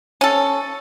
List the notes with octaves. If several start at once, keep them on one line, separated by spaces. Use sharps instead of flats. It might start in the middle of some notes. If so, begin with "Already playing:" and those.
C#4 A4